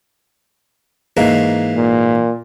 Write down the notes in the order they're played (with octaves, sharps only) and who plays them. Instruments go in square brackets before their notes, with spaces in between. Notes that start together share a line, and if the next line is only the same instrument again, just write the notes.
[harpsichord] G#2 E3 A#3
[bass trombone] A#2